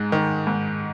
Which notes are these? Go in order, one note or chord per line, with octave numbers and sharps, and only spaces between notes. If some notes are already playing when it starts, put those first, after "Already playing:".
Already playing: G#2 G#3
D#3
G#2